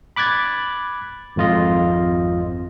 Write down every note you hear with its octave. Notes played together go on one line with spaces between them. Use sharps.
B5 D6 F#6 G#6 A6
G#1 F2 F4 D#5